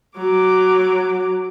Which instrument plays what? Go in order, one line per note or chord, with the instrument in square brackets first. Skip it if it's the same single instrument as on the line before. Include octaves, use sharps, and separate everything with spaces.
[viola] F#3 D6